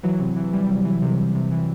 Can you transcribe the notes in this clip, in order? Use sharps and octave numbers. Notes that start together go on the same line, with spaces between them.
E3 F#3
C3
E3
E3 G3
C3
E3
C3
C3
C3
E3